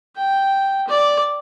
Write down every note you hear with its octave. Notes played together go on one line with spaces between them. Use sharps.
G5
D5